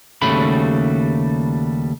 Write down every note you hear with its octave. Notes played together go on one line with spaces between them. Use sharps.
D#2 C#3 G3 A3 F#4 B5